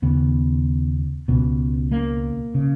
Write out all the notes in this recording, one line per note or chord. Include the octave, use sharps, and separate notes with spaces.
D#2 C#3 B3
C#2 B2 B3
A#3
C#3